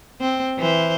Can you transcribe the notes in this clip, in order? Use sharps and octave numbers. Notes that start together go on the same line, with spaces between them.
C4
E3 C5